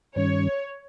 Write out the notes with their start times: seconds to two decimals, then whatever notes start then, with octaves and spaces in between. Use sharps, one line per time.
0.16 G2 D#3 G3 C#4 C#5